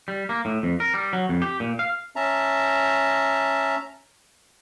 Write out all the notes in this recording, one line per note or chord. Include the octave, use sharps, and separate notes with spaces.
G3
A#3
A2
F2
A#4
G3
F#3
F2
G4
A#2
F5
C#4 E5 A5 A#5